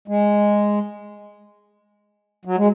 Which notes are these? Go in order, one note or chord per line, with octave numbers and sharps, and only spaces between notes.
G#3
F#3
G#3